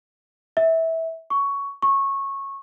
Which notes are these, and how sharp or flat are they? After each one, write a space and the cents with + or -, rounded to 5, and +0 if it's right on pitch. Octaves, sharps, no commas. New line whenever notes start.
E5 -20
C#6 +10
C#6 -15